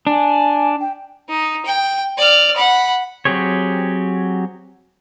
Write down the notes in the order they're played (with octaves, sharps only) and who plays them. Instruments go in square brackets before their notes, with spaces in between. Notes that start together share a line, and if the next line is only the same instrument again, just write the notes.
[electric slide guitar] D4 [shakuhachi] G#5
[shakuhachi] G5
[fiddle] D#4
G5
D5 F6
F#5 B5
[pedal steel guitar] F#3 C4 G4 G#4 C#5